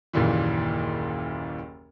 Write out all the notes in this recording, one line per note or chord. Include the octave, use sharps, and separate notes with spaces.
F#1 D#2 A#2 E3